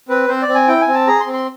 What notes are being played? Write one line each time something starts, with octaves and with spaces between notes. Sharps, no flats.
C4 B4
C4 C5
D5
C4
G#5
E4 G5
G#5
C4
A5
G#4 A#5
C6
C4
C6